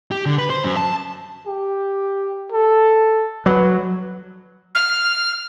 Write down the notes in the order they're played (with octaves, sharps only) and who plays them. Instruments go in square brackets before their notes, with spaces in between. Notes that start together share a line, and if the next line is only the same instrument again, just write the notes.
[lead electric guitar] G4
D3
B4
C5
F#2
A5
[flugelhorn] G4
A4
[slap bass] F#3 [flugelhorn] B4
[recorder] F6